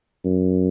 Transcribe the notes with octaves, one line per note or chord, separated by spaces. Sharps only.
F#2